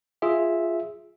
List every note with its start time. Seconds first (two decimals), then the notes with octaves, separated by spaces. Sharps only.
0.22 F4 G#4 E5